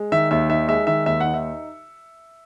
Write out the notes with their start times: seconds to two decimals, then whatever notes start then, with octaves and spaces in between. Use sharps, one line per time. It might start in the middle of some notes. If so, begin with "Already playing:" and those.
Already playing: G#3
0.12 D#3 E5
0.31 D#2 E5
0.49 D#4 E5
0.68 G#3 E5
0.87 D#3 E5
1.06 D#2 E5
1.20 D#4 F#5
1.34 E5